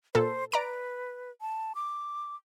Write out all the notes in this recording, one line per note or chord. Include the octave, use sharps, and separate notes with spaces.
A#2 A4 C5
B4 D5 A#5 D7
A5
D6